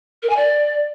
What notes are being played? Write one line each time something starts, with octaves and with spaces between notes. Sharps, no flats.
A#4
G#5
D5